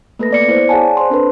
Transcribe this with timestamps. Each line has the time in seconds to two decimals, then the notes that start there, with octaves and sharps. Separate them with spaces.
0.19 A3 A#3 A4 B4 A#6
0.31 B3 D5 C#7
0.46 B3 E4 C5
0.69 G#4 C#5 D5 F#5 G#5 A5
0.97 C5 A5 C6
1.10 C4 D4 A4 B4